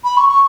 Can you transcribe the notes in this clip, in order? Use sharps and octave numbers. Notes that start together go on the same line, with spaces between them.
B5
C#6
C#6